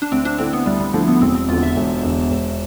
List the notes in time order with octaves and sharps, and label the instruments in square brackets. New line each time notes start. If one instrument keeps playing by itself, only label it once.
[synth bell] D4
[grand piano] D2 [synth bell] C4
[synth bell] D4
[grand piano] D3 A3 E4 [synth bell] C4
[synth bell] B3
[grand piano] D2 [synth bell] G3
[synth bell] G3
[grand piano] D3 A3 E4 [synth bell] F3
[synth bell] B3
[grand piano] E1 [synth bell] C4
[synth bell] C4
[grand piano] E2 D3 [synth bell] F4
[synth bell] E5
[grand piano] E1
E2 D3
E1